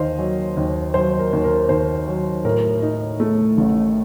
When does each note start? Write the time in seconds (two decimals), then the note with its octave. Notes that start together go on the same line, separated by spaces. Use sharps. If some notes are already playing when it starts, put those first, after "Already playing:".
Already playing: D#2 D#3 C5 D#5 F5
0.19 F#3
0.57 D#2
0.94 F#3 C5
1.19 A#4
1.33 D#2
1.44 A#4
1.69 D#2 C5
2.08 F#3
2.45 A2 A#4
2.82 D#4
3.20 A3
3.58 A1